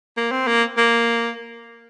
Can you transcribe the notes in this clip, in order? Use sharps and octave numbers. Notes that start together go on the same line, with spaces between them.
A#3
C4
A#3
A#3